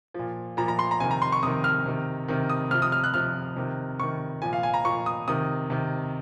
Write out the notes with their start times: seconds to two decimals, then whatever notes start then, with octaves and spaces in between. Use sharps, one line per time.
0.14 A#2 F3
0.57 A#2 F3 A#5
0.68 A#5
0.79 C6
0.91 A#5
1.00 C3 D#3 G#5
1.11 A#5
1.22 C6
1.32 C#6
1.43 C3 D#3 D#6
1.64 F6
1.86 C3 D#3
2.28 C3 D#3
2.50 D#6
2.71 C3 F3 F6
2.82 D#6
2.92 F6
3.04 F#6
3.14 C3 F3 F6
3.56 C3 D#3
3.99 C3 D#3 C#6
4.42 A#2 F3 G#5
4.53 F5
4.63 G#5
4.74 A#5
4.85 A#2 F3 C#6
5.06 D#6
5.28 C3 D#3 D#6
5.70 C3 D#3